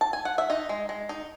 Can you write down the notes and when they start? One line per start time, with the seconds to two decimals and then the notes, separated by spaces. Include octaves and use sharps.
0.01 A5
0.13 G#5
0.25 F#5
0.38 E5
0.50 D#4 D#5
0.69 G#3
0.89 G#3
1.09 D#4